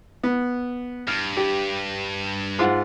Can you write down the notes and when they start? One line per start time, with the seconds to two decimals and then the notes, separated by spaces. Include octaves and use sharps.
0.24 B3
1.08 G2 F6
1.37 G4
2.59 G#2 F4 F#5